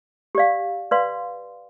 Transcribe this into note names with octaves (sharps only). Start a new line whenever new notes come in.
G4 D5 F5
B4 D5 F5 C6